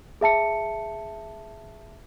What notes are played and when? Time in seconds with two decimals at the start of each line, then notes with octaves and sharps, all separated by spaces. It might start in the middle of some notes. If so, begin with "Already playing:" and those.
0.21 G#4 E5 A5 C#7